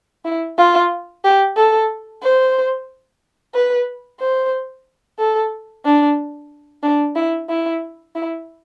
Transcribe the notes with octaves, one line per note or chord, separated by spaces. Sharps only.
E4
F4
G4
A4
C5
B4
C5
A4
D4
D4
E4
E4
E4